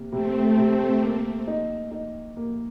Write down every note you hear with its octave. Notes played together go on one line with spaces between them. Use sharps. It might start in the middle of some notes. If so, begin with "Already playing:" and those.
Already playing: C3 A#3
C3 A3 C4
C3
A#3
D#4
D#4
A#3